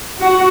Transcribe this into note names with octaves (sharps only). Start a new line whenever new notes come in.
F#4